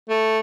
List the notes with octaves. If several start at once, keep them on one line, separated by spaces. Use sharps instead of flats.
A3